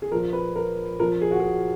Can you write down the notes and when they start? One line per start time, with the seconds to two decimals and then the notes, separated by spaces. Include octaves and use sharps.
0.02 G#4
0.12 A#2 F3 A#4
0.33 B4
0.56 A#4
0.99 A#2 F3 A#4
1.22 G#4
1.31 F#4
1.40 G#4